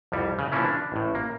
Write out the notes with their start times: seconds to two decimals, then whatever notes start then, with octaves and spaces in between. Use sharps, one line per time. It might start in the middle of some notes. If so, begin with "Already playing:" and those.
0.12 C2 F2 G3
0.39 C#3
0.52 E3 F3 G3 A#3 C#4 E4
0.65 D4
0.92 A1 A2
1.15 A#3